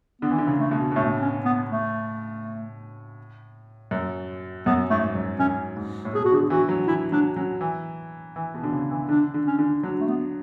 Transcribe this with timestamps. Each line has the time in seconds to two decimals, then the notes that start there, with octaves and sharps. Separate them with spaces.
0.22 D3 B3
0.31 E3
0.38 D3
0.47 C#3
0.59 A3
0.71 B2
0.92 B2
0.95 A2 A3
1.21 C#4
1.45 B3
1.70 A3
3.91 F#2
4.66 F#2 B3
4.90 G#2 A3
5.15 F#2
5.39 F#2 C#4
5.77 G#2
6.05 A2
6.13 B2 G#4
6.25 F#4
6.32 D3 G#4
6.50 E3 F#4
6.69 F#3
6.87 E3 E4
7.12 F#3 D4
7.36 F#3 C#4
7.61 E3
8.36 E3
8.54 B2
8.63 D3
8.73 C#3
8.91 E3
9.09 D3 D4
9.34 D3
9.46 C#4
9.59 D3
9.83 F#3 D4
10.00 A3
10.08 B3